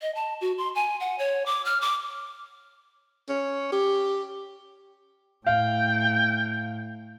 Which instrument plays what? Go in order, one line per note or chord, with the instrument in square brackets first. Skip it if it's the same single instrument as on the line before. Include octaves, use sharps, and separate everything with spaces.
[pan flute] D#5
A5
F#4
C6
G#5
F#5
C#5
D6
F6
D6
[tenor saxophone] C#4
G4
[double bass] A2 [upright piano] F5 [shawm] G5